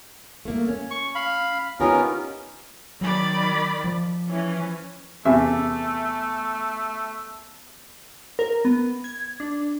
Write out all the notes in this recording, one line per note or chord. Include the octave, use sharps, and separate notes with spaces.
A3 A#3
C#4
C#6
F5 B5
B3 C#4 D#4 F4 G4 A#4
D#3 F#3 D5 B5
F3
E3 C#4
E2 C3 A3 E5
A#4
B3
G#6
D4